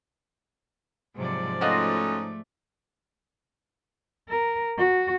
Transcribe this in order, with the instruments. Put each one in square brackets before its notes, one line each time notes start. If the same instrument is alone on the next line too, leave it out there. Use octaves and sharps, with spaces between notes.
[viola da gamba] G#2 F3 D5 [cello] C3 F#3
[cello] A3 [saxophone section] C#4 D#4 A4 [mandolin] F4 F#4 D#5
[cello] A#4
F#4